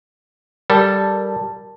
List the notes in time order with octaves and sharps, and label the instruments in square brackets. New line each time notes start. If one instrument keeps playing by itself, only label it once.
[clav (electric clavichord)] G3 A4 [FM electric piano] A#4 A5